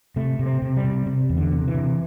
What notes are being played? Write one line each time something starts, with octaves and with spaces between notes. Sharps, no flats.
C3 A3
C3
C4
C3
G3
C3
C3
E2
D3
C3
E3
C3